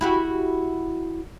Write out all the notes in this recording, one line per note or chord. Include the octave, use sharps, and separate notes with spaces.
E4 F#4 G4